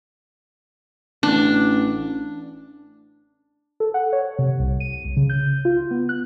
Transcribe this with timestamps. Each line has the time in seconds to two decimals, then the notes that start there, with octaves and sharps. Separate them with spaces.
1.23 A1 D4
3.80 A4
3.94 F#5
4.13 C#5
4.39 C3
4.59 C2
4.80 D#7
5.05 C2
5.17 C#3
5.30 G6
5.65 F4
5.91 B3
6.09 F#6